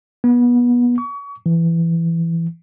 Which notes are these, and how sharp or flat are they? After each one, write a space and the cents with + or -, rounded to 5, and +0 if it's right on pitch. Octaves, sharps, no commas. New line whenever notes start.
B3 -25
C#6 +35
E3 +15